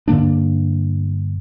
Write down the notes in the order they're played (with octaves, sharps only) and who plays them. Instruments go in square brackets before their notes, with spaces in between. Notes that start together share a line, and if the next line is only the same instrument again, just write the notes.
[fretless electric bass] G2 D3 A#3 D4